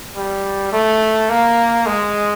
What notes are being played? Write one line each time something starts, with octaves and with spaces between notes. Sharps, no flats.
G3
A3
A#3
G#3